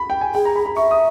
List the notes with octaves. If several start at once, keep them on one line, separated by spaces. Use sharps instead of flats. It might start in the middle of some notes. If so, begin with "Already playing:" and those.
Already playing: B5
G5
G#5
G#4 G5
A#5
B5
B5
E5 C#6
D#6